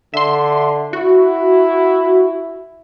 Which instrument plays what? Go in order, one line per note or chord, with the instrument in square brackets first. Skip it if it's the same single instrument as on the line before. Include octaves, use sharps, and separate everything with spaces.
[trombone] D3 [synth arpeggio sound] E5 C6
[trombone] E4 [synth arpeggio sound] F#4